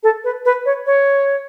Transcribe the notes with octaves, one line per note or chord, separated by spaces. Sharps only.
A4
B4
B4
C#5
C#5